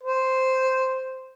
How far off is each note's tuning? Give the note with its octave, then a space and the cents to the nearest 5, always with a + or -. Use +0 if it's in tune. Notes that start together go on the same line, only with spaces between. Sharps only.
C5 -5